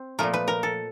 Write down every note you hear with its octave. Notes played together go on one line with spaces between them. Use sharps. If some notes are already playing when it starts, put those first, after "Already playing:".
Already playing: C4
A#2 F3 A3 A#4
B4
A#4
A4